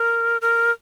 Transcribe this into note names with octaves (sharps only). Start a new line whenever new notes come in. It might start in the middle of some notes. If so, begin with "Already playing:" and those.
Already playing: A#4
A#4